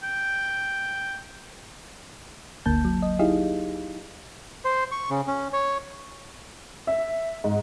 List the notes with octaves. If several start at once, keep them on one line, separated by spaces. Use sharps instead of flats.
G5
G1 D2 D3 A#3 A5 G6
F#3
D#5
D#4 E4 G4 G#4 D#5 F5
C5
C#6
C#3
C#4
C#5
E5
G#2